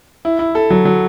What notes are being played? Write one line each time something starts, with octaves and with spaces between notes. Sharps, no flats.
E4
E4
A4
F#3
F#3